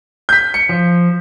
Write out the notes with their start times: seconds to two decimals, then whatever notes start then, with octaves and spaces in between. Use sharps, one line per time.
0.29 G6 B6
0.54 C#7
0.69 F3